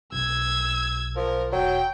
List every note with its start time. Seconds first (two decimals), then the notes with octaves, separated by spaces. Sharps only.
0.12 B1 E6 G#6
1.16 F3 A#4
1.52 E1 F#3 G5